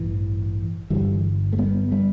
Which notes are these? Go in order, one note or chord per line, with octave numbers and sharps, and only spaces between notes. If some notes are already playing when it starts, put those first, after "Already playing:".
Already playing: A1 G2 E3
G1 G2 D3 E3 G3
A3
G3 B3
G3 B3